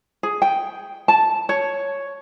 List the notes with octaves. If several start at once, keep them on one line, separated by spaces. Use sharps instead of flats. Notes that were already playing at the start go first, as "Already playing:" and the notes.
G#4
G5
A5
C#5